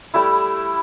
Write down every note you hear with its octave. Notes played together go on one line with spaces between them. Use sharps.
G3 A3 E4